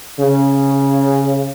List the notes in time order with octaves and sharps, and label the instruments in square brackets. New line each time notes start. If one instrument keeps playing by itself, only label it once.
[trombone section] C#3